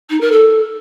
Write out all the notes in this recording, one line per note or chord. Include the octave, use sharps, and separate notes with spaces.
D#4
A#4
A4